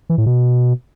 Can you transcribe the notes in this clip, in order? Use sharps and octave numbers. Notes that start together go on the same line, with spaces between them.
E3
A2
B2